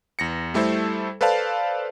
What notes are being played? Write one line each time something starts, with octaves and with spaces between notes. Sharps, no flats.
E2 A#6 C#7
G3 A3 E4 A4 C5
A4 B4 C5 D5 F5 A5